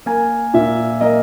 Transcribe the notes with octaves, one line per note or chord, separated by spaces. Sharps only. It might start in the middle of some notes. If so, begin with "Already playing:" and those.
A#3 G#5
A#2 E5
A#3 D#5